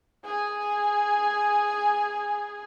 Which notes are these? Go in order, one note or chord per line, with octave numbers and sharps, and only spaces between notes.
G#4 G#5